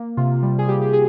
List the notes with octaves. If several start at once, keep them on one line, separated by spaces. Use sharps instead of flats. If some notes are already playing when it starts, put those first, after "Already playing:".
Already playing: A#3
C3 F4
G3
G#4
G3 G4
G4
G#4